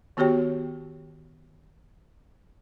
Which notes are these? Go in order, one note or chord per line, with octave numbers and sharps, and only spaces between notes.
D#3 B3 F#4 G4 C#5 G5